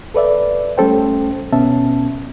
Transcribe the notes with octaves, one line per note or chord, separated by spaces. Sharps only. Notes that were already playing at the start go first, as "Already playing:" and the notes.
A4 B4 D5 E5
G3 A3 C#4 A4 C5 G5
D2 B2 B3 C#4 E5 A5